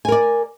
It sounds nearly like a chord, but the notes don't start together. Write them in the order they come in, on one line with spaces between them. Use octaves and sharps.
G#5 A#4 D5